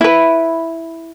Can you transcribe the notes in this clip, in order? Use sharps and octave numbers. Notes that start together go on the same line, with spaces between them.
E4 B4